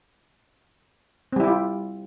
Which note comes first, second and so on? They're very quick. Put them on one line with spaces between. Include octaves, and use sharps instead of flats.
C4 G3 E4 G4 F4